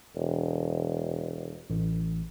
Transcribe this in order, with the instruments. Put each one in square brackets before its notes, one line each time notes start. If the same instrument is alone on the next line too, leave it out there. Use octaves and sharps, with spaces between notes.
[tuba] E1
[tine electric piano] A1